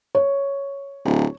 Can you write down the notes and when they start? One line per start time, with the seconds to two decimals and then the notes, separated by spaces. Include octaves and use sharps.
0.15 C#5
1.05 D1